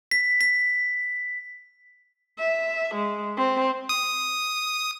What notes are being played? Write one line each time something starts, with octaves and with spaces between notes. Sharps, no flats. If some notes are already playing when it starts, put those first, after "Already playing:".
B6
B6
E5
G#3
C4
D#6